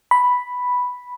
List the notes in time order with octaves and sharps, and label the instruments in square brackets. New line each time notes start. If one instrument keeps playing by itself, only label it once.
[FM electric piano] B5